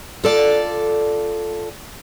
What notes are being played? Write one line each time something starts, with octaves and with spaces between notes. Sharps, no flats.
F4 A4 D5